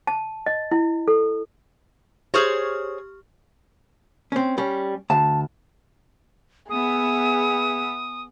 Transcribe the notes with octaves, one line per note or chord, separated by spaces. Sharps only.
A5
D#5
E4
A4
G4 G#4 C5 C#5 C#6 F6
C4 C#4
G3 C#4
D2 A5
B3 G#4 E5 D#6